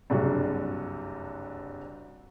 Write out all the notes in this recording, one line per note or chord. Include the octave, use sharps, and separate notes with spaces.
F#1 C2 G2 C3 F#4